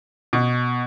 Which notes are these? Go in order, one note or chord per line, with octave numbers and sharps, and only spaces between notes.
B2